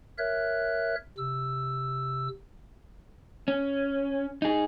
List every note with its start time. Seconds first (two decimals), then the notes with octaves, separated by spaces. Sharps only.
0.18 A#4 C#5 E5 F#6
1.18 C3 E6
3.48 C#4
4.42 D#4 G#4